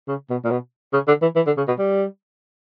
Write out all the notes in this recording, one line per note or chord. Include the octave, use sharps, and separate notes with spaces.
C#3
B2
A#2
B2
C#3
D3
E3
E3
D3
C#3
B2
G3